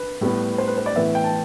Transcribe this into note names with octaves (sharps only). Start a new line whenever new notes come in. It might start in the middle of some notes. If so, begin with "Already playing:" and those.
Already playing: B4
A2 G3 B3
C5
B4
C5
D5
A2 E3 B3 E5
G5
A5